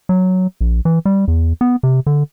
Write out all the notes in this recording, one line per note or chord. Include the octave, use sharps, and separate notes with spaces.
F#3
A#1
E3
G3
E2
B3
C3
D3